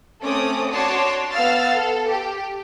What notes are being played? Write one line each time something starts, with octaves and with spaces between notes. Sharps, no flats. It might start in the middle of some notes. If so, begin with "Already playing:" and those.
A3 C4 C#4 D6 D#6
D4 F#4 C#5 A5 C6 D6
B3 F5 E6 F6 A6 C7
A4
G4